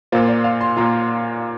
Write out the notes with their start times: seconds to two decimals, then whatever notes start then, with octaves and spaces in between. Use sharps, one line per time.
0.12 A#2 A#3 F4 C5
0.28 D5
0.44 F5
0.61 C6
0.77 A#2 A#3 F4 A#5